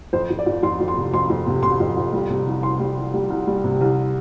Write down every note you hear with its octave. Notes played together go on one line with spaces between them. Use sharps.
F2 C5
F2
D5
F2
F2 C6
F2
C6
C3
F2 C6
F2
C3
C3 C6
F2
F2
G3
C3
C2
C2 C6
G3
C2
G3
C2
G3
C3
C2